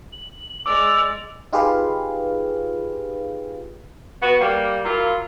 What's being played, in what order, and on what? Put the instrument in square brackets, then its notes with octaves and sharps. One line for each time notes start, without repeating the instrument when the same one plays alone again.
[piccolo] F#7
[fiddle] G#3 D5 [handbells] D6 [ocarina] E6 [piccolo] F7
[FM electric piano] D#4 F4 G4 G#4 B4 F5
[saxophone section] B3 F#4
G3 A#3
F#3 A#3 E4 F4